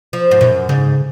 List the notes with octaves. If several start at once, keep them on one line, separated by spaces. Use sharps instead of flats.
F3
G#2
F#2 A#2
G#2 C#3